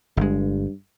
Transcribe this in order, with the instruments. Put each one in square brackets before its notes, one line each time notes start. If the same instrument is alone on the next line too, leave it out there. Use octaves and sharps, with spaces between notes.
[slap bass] G1 G#3 [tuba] G2